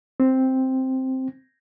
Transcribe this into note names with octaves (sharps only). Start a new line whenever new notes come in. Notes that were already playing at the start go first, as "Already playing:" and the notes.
C4